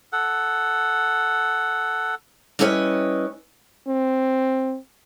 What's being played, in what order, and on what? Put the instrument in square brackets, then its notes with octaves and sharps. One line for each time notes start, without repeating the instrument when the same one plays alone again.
[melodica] A4 F#5
[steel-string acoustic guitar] G3 C#4 E4 B4 C#5 D#5
[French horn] C4